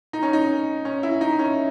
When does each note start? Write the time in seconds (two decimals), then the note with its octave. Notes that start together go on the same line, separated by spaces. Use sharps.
0.13 D#4
0.23 C#4
0.33 D#4
0.85 C#4
1.03 E4
1.21 D#4
1.39 C#4